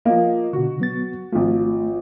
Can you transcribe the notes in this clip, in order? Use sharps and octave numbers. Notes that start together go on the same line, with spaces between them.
F3 A#3 D#5
B2 D3 F#4
F#3 B3 A6
G#1 F3 A3